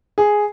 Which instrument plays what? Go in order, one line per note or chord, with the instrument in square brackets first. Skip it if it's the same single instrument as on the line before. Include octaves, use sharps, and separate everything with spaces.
[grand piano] G#4